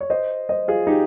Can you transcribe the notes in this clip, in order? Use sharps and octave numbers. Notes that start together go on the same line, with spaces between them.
C#5
C5 D#5
C5 D#5
F4 G#4
D#4 G4